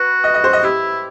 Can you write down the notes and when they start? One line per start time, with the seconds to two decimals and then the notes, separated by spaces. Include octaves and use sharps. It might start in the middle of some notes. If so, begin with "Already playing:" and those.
Already playing: F#4 B4
0.24 D#5
0.34 D#5
0.44 C5
0.53 D#5
0.63 E4 G4